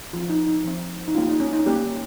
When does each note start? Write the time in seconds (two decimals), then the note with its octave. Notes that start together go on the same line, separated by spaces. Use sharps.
0.13 F3 C4 F4
0.30 D#4
0.47 D#4
0.64 F3 C4
1.08 D#4
1.15 G3 A#3 C#4 F4
1.28 D#4
1.40 C#4
1.53 D#4
1.66 G3 A#3 C#4 G4